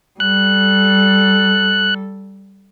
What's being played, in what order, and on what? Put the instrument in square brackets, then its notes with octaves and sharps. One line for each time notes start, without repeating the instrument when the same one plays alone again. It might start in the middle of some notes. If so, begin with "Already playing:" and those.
[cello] G3 A4 [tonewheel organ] F#6